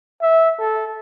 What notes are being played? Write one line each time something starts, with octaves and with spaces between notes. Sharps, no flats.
E5
A4